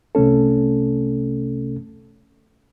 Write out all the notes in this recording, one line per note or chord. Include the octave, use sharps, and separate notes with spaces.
C2 C3 A3 C#4 A4